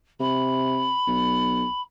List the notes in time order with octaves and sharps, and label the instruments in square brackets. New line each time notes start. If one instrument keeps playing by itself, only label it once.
[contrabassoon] C3 [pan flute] B5
[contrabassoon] B1